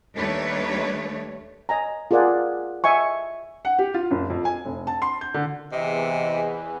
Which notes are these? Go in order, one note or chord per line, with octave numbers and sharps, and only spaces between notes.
D#2 G3 A3 D4 B4 C#5
D#5 G#5 A#5
F4 G#4 A#4 D5 F#5 G#5
D#5 E5 G#5 C#6
F#5
G4
F4
F#1
F2
G#5
F1
A5
C6
G6
D3
E2 C3 E3 D#5